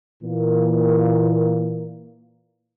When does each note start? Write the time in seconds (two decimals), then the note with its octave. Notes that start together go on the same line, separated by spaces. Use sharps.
0.23 A#2 E3 A#3